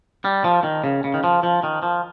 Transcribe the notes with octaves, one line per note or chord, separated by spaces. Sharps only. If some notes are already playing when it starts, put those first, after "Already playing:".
G3
F3
D#3
C#3
C#3
D#3
F3
F3
D#3
F3